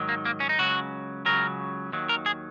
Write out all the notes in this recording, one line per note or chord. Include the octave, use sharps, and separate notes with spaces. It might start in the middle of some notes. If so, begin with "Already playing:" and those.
Already playing: G#2 D#3 F#3
A#3
A#3
C#4
D#4
C#2 C#3 F#3 F#4
C#2 C#3 F#3 A#4
D#2 D#3 F#3
A#4
G#4